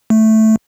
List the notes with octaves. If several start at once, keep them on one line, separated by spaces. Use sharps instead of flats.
A3